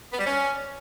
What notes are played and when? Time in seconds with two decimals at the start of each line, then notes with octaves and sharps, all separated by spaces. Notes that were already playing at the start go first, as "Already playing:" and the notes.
0.12 B3
0.18 G3
0.25 C#4